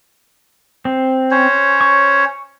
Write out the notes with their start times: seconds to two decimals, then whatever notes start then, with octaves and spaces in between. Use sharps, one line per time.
0.85 C4
1.31 C#4 C5 C#5
1.81 C#6